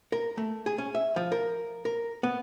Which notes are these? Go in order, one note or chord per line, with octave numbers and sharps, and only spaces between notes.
A#4
A3
G#4
C#4
E5
F3
A#4
A#4
B3